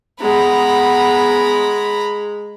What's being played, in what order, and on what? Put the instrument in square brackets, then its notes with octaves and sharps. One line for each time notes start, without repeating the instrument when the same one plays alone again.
[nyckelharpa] G#3 [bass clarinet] B3 [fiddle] A#5 B5